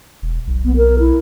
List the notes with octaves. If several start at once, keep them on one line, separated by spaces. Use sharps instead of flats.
E1
B1
B3
A#4
E4